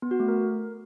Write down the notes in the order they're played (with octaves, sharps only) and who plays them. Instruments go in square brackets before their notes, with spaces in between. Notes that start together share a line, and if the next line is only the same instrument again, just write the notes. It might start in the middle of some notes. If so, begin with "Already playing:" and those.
[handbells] B3
F#4
A3
A#4